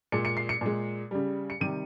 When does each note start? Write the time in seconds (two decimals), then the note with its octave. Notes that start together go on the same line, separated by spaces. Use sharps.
0.12 A#2 G#3 C#7
0.25 C#7
0.37 C7
0.49 C#7
0.61 A#2 G#3
1.11 C#3 G3
1.50 C#7
1.60 C3 D#3 G3 D#7